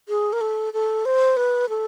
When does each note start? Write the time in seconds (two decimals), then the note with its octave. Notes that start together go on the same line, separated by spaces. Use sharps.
0.09 G#4
0.33 A#4
0.41 A4
0.73 A4
1.05 C5
1.37 B4
1.69 A4